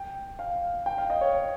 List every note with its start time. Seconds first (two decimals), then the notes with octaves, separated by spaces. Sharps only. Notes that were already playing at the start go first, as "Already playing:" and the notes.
Already playing: G5
0.39 F5
0.86 G5
0.98 F5
1.10 D#5
1.21 C#5